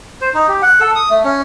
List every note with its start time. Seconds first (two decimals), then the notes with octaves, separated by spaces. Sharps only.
0.21 C5
0.34 D#4
0.48 G4
0.62 F#5
0.80 A4
0.95 D#6
1.10 A3
1.24 C#4